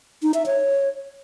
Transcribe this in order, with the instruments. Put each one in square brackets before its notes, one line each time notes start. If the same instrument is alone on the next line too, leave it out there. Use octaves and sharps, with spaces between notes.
[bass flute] D#4
E5
C#5